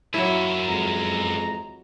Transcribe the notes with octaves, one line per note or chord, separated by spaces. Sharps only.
F#2 F#3 A#3 E4 E5
F2 E3 G#3 A#5